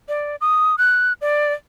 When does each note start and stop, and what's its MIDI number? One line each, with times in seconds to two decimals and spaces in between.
0.09 0.36 74
0.41 0.76 87
0.78 1.13 90
1.21 1.53 74